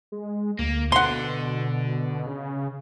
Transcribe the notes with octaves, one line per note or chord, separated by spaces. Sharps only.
G#3
D2 A#3
B2 D3 F#5 C6
C#3